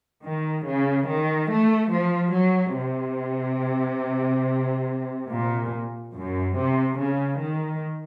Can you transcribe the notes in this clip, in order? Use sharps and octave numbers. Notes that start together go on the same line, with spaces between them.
D#3
C#3
D#3
A3
F3
F#3
C3
A#2
F#2
C3
C#3
D#3